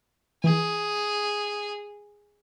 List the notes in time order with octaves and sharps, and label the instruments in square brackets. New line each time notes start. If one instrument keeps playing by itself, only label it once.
[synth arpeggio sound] E3 [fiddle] G#4